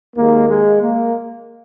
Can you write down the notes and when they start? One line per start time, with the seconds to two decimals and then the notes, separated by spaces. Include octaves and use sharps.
0.16 D#2 D#3 G#3 A#3
0.49 G#3
0.81 A#3